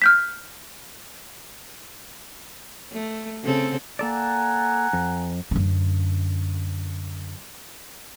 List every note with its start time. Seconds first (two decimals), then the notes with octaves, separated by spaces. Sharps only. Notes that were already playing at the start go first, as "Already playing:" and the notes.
0.02 F6 G6 B6
2.93 A3
3.44 C#3 C4 A4
3.99 A#3 A4 D5 F#5 G#5 A#5
4.93 F2
5.51 F#2 D3